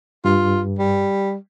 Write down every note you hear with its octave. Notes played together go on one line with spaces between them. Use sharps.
G2 F4
G3